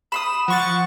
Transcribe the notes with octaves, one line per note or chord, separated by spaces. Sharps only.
B5 C6 D#6 E7
F3 F#5 C#6 A6